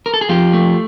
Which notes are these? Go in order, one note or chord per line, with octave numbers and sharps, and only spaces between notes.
A#4
A4
G#4
F2 F4 G4
A3